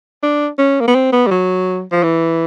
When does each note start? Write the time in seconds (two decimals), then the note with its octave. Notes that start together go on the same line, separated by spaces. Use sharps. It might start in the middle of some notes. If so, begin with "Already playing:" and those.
0.23 D4
0.58 C#4
0.80 A#3
0.87 B3
0.95 C4
1.12 B3
1.27 G3
1.31 F#3
1.92 F3
2.03 E3